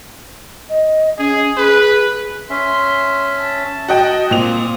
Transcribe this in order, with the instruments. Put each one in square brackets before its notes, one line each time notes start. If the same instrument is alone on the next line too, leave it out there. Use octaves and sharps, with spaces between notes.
[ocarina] D#5
[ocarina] C#4 [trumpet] G#4
[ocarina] G#4 [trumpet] B4
[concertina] C#4 E5 [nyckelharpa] C6
[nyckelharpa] A5
[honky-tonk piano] F#4 D#5 G5
[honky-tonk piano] A#2 F7 [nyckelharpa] C4 [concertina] D#6